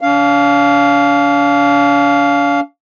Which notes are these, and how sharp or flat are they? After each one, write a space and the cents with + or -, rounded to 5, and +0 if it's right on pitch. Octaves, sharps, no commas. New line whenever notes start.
D4 -45 F5 +0